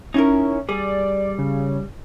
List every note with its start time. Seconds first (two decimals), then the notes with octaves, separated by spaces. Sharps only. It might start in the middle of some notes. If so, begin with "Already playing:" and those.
0.14 C#4 D#4 E4 A#4
0.69 G3 G#4 D5
1.38 C#3